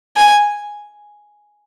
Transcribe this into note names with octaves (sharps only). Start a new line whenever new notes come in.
G#5